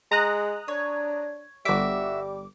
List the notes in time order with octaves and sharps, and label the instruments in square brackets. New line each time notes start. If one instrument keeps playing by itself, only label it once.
[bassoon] G#3 [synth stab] A#5 D#6 F#6
[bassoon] D4 [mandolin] C#5
[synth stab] G1 D6 [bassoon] G3 [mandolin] F#4 E5